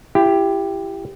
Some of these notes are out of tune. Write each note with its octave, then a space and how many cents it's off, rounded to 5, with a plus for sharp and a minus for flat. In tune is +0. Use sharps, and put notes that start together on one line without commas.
E4 +35 G4 +5